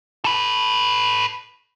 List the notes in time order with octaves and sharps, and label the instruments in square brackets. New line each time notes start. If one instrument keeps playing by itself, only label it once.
[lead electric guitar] A4 B4